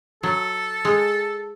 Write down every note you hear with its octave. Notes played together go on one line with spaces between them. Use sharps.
F#3 A4
G#3